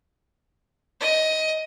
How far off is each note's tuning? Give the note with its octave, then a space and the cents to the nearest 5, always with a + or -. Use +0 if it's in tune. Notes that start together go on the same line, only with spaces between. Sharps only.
D#5 +15